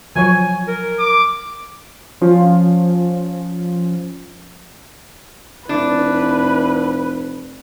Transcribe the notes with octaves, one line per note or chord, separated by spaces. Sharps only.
F3 F#3 C#5 G#5
A#4
D6
F3 C#4 F4
F1 D4 E4 B4